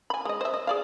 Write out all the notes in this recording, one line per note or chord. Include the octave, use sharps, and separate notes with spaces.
G#5 B5
G#3 D#5
C5 E5
D#5
G#4 D5 F5